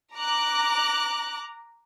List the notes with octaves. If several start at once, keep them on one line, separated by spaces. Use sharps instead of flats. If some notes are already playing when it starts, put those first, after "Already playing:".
A#5 D6 F#6